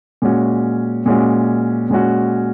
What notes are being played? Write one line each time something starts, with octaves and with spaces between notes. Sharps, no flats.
A#2 G#3 C#4 F#4
A#2 G#3 C#4 F#4
A#2 G#3 C#4 F#4